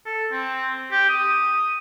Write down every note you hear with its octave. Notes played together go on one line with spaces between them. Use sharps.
A4
C4
G4
D#6